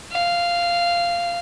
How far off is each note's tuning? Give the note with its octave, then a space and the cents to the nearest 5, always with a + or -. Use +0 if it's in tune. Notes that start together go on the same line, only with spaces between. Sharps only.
F5 -10